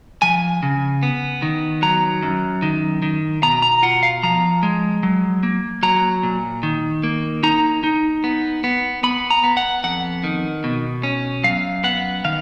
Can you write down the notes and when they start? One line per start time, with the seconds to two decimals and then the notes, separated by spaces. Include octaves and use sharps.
0.22 F3 G#5
0.63 C#3
1.03 B3
1.42 D#3
1.82 F#3 A#5
2.22 F#2
2.62 D#3
3.02 D#3
3.43 B2 A#5
3.62 A#5
3.83 F4 F#5
4.03 F5
4.23 F3 A#5
4.63 G#3
5.03 F#3
5.43 A#3
5.83 F#3 A#5
6.23 A#2
6.63 D#3
7.03 A#3
7.43 D#4 A#5
7.84 D#4
8.24 B3
8.64 B3
9.03 B3 B5
9.31 A#5
9.44 B3
9.57 F#5
9.84 F2 F#5
10.24 D#3
10.64 B2
11.03 C#4
11.44 F#2 F5
11.84 B3 F#5
12.25 D#3 F5